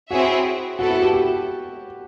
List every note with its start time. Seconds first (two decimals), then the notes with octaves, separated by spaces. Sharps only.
0.11 C4 E4 F#4 G#4 C#5 E5
0.79 B3 E4 F#4 A4
0.91 F#4
1.02 G4
1.13 G4